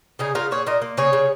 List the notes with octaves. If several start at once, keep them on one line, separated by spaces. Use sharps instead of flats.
C#3 D#4 G#4
C#3 F4 A#4
A#2 G#4 C#5
A#2 A#4 D#5
A#3
C#3 G#4 C#5
C#3